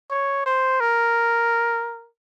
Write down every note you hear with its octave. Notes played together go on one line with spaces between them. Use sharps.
C#5
C5
A#4